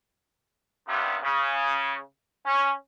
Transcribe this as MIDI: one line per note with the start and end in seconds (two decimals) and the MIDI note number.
0.87 1.16 43
0.87 1.16 48
0.87 1.16 51
0.87 1.16 55
0.87 1.16 59
1.23 1.98 49
2.45 2.71 61